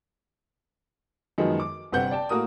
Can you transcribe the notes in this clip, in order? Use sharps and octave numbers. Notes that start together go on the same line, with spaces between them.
F#2 D#3 F3 G#3 B3
D6
G1 C3 C4 B4 F#5 G6
D5 G5 A5
A2 A#3 F#4 A#4 D#6